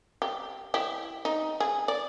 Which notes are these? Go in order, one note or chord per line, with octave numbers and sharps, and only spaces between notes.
G4
E4 G4
D#4
G#4
D5